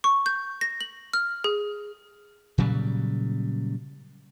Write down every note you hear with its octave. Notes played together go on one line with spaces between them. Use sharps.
C#6
G6
A#6
F#7
F6
G#4
A#2 C#3 F#3 G3